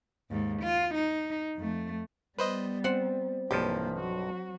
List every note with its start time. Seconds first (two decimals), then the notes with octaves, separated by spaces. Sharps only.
0.31 D#2 G#2
0.62 F4
0.95 D#4
1.57 F2 A3
2.38 G3 B3 B4 C5 D#5
2.84 C4 F#5
3.51 B1 G2 E3 F3 A#3 G4
4.00 F#3 F#4